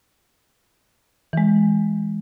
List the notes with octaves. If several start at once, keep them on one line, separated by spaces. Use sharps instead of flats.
E3 G#3